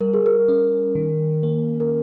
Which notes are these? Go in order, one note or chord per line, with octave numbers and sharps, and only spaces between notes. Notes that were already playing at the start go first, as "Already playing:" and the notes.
G3 A#4
G#4
A#4
C#4
D#3
A#3
A#4